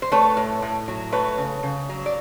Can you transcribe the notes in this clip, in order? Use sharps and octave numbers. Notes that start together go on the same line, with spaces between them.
C5
A3 B4 C#5
A2
A2
F#3
A3 B4 C#5
C#3
C#3
F#3
D5